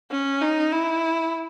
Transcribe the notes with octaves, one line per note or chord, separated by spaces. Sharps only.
C#4
D#4
E4